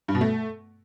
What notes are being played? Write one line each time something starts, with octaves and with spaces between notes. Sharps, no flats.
G2
B2
A3